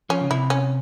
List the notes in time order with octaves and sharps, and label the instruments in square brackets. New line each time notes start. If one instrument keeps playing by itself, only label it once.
[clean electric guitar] F3 [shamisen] C#4
[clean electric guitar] C#3
[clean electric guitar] C3 [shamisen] E4
[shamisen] C#4